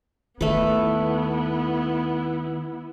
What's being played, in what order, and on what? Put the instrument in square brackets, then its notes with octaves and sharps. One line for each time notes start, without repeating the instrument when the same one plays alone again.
[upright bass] D#2 D#3 [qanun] A3 B4 [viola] B3 E4